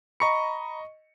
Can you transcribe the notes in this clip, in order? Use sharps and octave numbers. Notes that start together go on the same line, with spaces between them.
D#5 A#5 B5 C#6 C#7